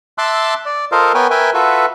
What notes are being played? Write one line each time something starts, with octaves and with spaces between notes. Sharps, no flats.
E5 A5 C6 D6 E6 F#6
D5
F4 A4 A#4 C5 D#5 F5
B3 A#4 B4 C#5 G5 G#5
A#4 B4 E5 G5 G#5
F4 F#4 A4 B4 E5